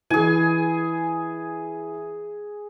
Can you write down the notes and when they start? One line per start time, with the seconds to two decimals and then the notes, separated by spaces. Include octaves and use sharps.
0.10 E3 G#4 G#5